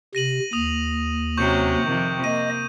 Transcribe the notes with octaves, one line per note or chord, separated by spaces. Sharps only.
C3 A#6 D#7 F#7
D#2 D#6 F7
C3 F#3 C#4 C#6 G6
F2 C3 D#3
A#3 D#5 D#7